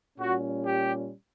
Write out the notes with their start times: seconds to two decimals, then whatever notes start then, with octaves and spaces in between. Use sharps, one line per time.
0.18 A#2 G3 C#4 F#4
0.65 G4